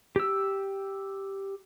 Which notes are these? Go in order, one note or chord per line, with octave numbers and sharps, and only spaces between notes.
G4 E6